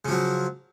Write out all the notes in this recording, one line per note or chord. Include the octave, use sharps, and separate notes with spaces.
C#3 F3 F#3